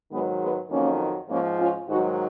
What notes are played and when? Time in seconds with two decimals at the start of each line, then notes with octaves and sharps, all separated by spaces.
0.11 G#2 D#3 F#3 G#3 B3
0.41 G#3 B3
0.70 F2 D#3 F#3 A#3 C#4
1.29 G#2 F3 A#3 C#4
1.59 C#4 F4
1.88 G#2 D#3 F#3 D#4 F#4